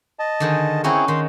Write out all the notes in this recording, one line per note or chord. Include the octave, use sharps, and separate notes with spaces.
D#5 A5
D3 D#3 G#4
C4 C#4 D#4 E4 F#4 G#4
D#3 C6